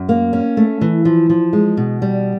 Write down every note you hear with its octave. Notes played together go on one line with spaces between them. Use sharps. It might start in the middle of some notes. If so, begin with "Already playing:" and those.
Already playing: F#2
A#3
C#4
A3
E3
F3
F3
G#3
B2
G3